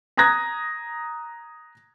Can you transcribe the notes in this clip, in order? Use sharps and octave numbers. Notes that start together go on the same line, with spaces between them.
A#5 D#6 F#6 G#6 A#6